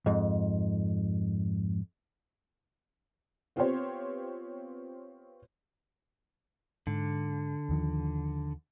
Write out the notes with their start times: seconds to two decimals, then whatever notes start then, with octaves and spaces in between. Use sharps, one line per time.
0.06 F2 G#2
3.56 B3 C4 F4 G4 C5 C#5
6.87 G#2 D3
7.69 D#2 D#3 F3